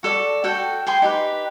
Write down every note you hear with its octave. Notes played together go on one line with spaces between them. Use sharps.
F#4 A4 D5
F#4 A4 G5
G#4 G5 C6
D#4 G4 B4